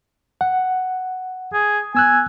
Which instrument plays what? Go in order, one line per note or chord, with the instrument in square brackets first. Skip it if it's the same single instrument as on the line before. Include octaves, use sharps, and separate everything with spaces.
[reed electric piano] F#5
[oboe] G#4
[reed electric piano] B3 E6 F#6 [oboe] G#5